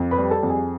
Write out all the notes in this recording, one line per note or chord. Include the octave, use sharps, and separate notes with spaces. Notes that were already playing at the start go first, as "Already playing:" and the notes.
Already playing: F2
B4 B5
G3
A4 A5
F2
G#4 G#5